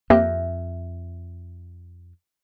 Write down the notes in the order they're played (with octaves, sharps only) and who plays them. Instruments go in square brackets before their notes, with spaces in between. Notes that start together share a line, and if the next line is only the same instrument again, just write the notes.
[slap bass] F2 [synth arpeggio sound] A#3 C4 G4 [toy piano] E5